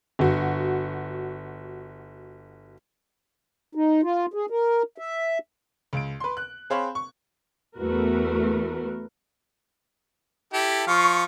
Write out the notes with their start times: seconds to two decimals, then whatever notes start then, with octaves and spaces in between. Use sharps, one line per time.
0.19 G1 F#4
3.75 D#4
4.03 F4
4.34 G#4
4.50 A#4
4.98 E5
5.93 C#2 D7
6.20 B4 C6
6.37 F#6
6.70 C4 G#4 C5 C#5 F5 B5
6.95 C#6
7.78 E2 A3 F#4 A#4 B4
10.53 E4 G4 A4
10.87 F3 F5 C#6